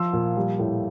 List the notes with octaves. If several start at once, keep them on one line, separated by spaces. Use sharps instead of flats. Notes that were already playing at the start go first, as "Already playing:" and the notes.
Already playing: F3 C6 E6
A#2
G3
A2